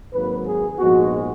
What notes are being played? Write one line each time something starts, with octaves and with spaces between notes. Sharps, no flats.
G#1 G#2 F#3 A#3 B4
G#4
A#1 G#2 F3 G#3 B3 F#4